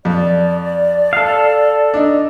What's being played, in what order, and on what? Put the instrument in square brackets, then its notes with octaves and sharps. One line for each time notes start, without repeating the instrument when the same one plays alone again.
[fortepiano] F2 [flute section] D5
[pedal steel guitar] A4 F5
[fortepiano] D4 D#4